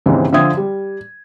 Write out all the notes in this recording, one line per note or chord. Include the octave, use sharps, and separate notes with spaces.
D#2 G#2 C#3 E3 C4
D3 F3 E5 G5 D#6 G#6
G3